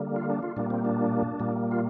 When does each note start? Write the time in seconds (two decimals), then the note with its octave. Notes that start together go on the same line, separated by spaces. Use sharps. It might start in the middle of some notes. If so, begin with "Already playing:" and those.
Already playing: D3 G3 A#3
0.16 F4
0.30 D4
0.43 F4
0.56 A#2 G3 A#3 D4
0.70 C4
0.85 D4
1.40 A#2 G3 A#3
1.71 F4